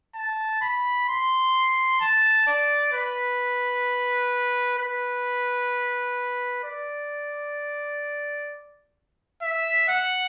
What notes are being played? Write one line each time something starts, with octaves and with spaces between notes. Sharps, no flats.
A5
B5
C6
A5
D5
B4
B4
D5
E5
F#5